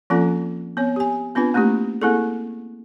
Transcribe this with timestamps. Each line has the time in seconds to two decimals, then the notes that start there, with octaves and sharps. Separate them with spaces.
0.10 F3 A#3 C4 C#4 F4 A4
0.77 B3 C4 C#5
0.96 G4 G#5
1.35 B3 C4 D4 F4 B4
1.54 A3 A#3 C#4 E4 G4
2.02 A#3 C4 E4 G#4 A4